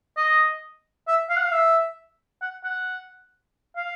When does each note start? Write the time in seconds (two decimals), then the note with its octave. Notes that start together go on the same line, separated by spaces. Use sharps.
0.17 D#5
1.08 E5
1.29 F5
1.37 F#5
1.43 F5
1.51 E5
2.42 F#5
2.64 F#5
3.76 F5